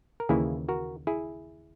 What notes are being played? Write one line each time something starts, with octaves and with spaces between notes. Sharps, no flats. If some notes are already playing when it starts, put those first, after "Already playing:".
A#4
D#2 C#3 E3 A#3 E4 G#4
F#4 A#4
E4 G#4